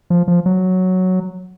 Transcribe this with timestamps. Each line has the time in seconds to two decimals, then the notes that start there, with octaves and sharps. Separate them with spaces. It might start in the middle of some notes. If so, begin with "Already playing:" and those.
0.10 F3
0.28 F3
0.46 F#3